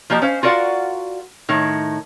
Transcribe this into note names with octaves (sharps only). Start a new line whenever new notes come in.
F3 A#3 G4 D#5
C#4 C5 F5
F4 F#4 A#4 D5 F5 F#5
A2 D#3